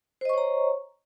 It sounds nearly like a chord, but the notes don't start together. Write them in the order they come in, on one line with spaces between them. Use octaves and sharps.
C5 D#5 C#6 C#5 A#5